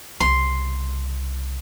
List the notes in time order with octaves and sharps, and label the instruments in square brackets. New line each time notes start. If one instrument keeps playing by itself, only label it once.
[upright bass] C2 C#3 [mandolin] C6